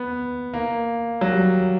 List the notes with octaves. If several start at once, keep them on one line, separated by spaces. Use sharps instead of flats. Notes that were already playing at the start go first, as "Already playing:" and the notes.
Already playing: B3
A#3
F#3
G3